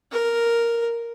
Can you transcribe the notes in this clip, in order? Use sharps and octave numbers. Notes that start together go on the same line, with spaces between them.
A#4